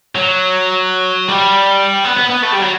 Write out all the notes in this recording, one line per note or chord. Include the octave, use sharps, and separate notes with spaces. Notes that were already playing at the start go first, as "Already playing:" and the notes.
F#3
G3
B3
B3
B3
A3
G3
F#3